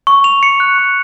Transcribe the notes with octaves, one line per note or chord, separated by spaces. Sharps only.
C#6
F7
C#7
F#6
C#6